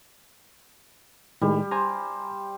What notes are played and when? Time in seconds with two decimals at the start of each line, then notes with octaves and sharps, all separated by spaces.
1.41 A2 D#3 G3 G#3
1.71 C5 G#5 A#5